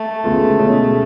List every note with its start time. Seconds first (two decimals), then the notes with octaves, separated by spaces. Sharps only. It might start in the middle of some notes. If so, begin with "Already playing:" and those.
Already playing: A3
0.24 D2 C#3 G#3 B3 F4
0.59 B2 G#3 C#4 G#4